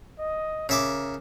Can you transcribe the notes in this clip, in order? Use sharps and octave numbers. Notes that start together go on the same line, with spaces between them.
D#5
C#3 A#4 E5 D6